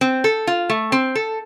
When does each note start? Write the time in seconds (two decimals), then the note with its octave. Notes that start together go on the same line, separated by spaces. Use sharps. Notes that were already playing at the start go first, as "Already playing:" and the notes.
0.01 C4
0.24 A4
0.47 F4
0.70 A3
0.92 C4
1.15 A4